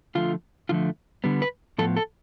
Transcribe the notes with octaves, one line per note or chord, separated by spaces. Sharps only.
D3 F3 A3 F4
D3 F3 A3 F4
D3 G3 B3
B4
A2 F3 B3 A4
A4